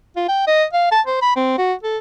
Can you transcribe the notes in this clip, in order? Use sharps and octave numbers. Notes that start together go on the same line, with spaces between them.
F4
G5
D#5
F5
A5
C5
B5
C4
F#4
A4